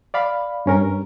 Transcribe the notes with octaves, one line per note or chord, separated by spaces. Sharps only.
D5 F5 B5
G2 C#4 A#4